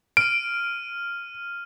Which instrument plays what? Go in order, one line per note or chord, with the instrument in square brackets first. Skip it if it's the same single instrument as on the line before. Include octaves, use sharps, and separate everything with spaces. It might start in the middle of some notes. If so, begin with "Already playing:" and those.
[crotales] F6 D#7 [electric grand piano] D7